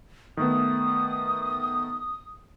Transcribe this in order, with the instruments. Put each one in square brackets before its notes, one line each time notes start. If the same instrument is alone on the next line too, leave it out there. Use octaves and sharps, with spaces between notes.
[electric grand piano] D#3 A3 B3 [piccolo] D#6